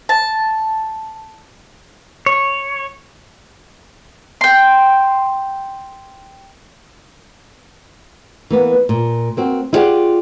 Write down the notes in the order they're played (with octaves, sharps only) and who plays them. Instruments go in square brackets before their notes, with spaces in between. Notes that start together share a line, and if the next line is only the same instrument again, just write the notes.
[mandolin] A5
[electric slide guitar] C#5
[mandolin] G5 C6
[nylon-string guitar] E3 A#3 B3
A#2
A#3 C4 F#4
E4 F4 G4 G#4 D5 F#5